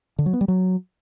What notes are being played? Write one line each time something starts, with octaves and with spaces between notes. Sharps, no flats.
D3
F#3
B3
G3
F#3